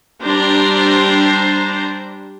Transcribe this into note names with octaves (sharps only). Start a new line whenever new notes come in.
G3 D4 C5 A#5